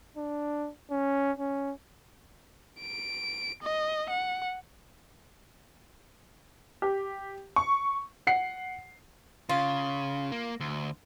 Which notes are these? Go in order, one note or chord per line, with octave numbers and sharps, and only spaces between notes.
D4
C#4
C#4
D7
D#5
F#5
G4
C#6
F#5 C7
C#3 F4
A#3
D2